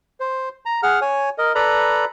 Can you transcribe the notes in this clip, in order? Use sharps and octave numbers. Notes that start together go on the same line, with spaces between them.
C5
A#5
G#4 F#5 F6
C#5 G#5
A#4 D#5
A4 B4 D5 A#5 B5